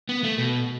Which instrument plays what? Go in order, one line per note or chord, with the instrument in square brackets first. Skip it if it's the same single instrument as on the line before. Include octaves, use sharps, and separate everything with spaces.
[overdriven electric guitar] B3
A3
B2